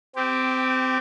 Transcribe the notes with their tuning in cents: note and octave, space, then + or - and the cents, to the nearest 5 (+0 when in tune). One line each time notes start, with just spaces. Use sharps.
C4 -20 G4 +0